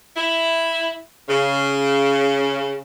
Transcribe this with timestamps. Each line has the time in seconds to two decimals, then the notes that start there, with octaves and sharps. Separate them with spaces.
0.17 E4
1.29 C#3